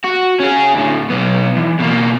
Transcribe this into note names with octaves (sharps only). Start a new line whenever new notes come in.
F#4
C#4 G#4
D2 A2
B1 B3
E2
B2 A#3